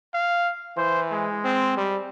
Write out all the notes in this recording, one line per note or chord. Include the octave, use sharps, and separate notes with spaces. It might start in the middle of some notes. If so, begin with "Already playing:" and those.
F5
E3 C5
G#3
C4
G3